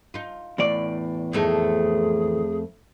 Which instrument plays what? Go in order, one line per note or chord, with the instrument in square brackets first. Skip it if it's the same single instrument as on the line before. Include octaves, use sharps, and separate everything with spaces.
[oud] D#4 F4
[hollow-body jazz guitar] E2 A2 D5
[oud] F2 A3 D#4 [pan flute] G#4